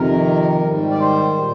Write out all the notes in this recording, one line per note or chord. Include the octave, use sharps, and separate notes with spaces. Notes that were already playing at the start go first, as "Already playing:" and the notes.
Already playing: F2 C3 D#3 A#4
G#2 D#3 G3
D5
C5
A#2